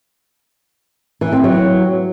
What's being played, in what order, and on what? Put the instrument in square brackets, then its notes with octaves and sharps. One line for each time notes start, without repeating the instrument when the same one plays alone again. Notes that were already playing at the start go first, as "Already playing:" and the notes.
[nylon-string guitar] E3
C4
F#3